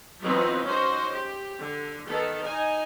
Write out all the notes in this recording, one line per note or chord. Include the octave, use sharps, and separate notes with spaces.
E3 F#3 B3 C4 D#4 F4
C#4 D#4 F#4 C5
G4
D3
D#3 B3 A4
D#4 G#5